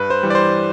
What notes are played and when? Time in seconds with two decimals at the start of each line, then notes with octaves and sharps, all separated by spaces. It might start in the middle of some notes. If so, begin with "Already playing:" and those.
Already playing: G2 B4
0.10 C5
0.23 E3 G3
0.30 D5
0.35 C5